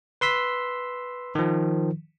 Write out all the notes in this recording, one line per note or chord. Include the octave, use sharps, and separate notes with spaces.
B4 C6 E6 B6
D#3 F3